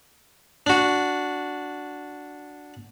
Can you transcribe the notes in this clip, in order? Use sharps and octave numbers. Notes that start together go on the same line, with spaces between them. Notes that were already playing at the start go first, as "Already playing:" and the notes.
D4 F#4